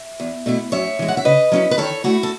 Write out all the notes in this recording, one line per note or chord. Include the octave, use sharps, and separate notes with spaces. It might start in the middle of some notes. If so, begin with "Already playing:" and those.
Already playing: E5
E2
B2 A3 E4
F#2 C#5 E5
E3 G#3
F#5
E5
C#3 B4 D#5
F#3 C#4 E4
B4
D#3 A4 C#5
A3 E4 F#4
A4